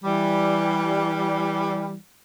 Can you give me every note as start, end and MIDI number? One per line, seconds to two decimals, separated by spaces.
0.03 1.95 52
0.03 1.95 55